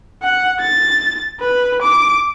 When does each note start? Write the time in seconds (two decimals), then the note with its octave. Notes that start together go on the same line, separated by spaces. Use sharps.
0.22 F#5
0.60 A6
1.40 B4
1.82 D6